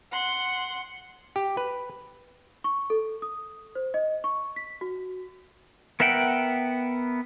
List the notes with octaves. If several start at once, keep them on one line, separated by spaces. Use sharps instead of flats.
F#5 C6
G4
B4
C#6
A4
D#6
C5
D#5
C#6
B6
F#4
B3 A#4 E5 F#5 G5